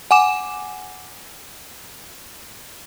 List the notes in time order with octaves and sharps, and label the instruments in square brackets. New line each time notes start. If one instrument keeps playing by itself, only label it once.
[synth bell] F#5 G#5 D6 E7